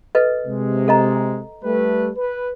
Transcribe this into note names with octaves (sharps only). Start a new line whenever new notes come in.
A4 B4 D#5
C3 G#3
A4 D#5 A#5
G3 A3 B4
B4